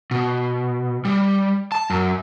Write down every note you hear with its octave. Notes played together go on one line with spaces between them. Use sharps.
B2
G3
A5
F#2